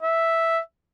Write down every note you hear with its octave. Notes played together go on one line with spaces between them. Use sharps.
E5